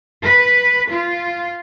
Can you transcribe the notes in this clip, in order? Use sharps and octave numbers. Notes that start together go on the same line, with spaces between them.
B4
F4